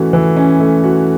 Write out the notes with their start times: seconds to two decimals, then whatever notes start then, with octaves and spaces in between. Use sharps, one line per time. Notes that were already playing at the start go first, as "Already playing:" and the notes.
Already playing: E3 A3 C#4 F#4
0.13 E3
0.36 C#4
0.60 A3
0.84 F#4